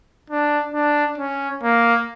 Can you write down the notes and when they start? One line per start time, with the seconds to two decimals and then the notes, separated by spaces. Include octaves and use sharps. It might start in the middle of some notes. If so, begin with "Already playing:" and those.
0.30 D4
0.74 D4
1.18 C#4
1.63 A#3